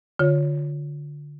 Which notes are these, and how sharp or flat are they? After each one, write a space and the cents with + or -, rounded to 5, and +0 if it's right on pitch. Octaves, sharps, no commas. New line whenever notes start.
D3 +0 F4 +25 C#5 +0